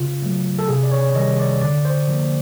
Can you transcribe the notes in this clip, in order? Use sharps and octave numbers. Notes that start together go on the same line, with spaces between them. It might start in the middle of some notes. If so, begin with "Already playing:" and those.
Already playing: C#3 F4
F#3 A3
A4
C3 G#4
D5
C#5
D#3 G3 D#5
D5
D3 D5
C5
F3 A#3